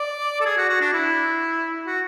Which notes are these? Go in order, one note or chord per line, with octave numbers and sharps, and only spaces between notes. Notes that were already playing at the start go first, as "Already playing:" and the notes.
Already playing: D5
A4
G#4
F#4
F#4
D4
E4
F#4